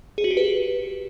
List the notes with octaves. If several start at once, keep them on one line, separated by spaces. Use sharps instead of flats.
G#4
F#4
G4
B4